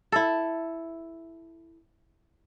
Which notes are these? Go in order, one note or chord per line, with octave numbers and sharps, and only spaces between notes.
E4 A4